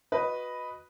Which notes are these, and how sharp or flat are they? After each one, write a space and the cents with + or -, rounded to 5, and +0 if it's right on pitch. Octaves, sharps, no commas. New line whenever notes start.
F#4 -20 B4 +0 D#5 +0